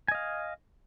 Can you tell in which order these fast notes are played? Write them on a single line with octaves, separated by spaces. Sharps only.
G#5 D#5 F5